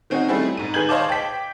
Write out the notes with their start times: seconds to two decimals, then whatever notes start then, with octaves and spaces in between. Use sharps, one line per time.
0.10 D#3 C4 C#4 D#4 F#4
0.28 G3 A3 C4 E4 G#4
0.57 G#2 D#7
0.74 D#3 G#4 B4 G6 G#6 F#7
0.89 C5 C#5 D#5 F5 A5 D6
1.09 G5 B6